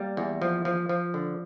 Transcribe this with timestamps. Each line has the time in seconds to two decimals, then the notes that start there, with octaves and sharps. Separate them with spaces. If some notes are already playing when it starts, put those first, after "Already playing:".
Already playing: G3 A#3
0.17 E2
0.42 F3
0.65 F3
0.89 F3
1.14 D3